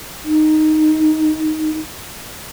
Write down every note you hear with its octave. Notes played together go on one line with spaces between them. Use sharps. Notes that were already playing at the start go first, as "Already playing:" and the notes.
D#4